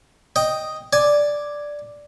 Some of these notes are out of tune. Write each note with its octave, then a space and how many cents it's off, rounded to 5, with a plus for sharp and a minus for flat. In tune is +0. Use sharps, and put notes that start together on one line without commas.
D#5 +0 G5 +0
D5 +0 G#5 +0